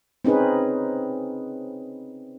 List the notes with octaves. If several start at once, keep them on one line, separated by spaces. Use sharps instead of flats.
C4 C#4 D#4 G#4 B4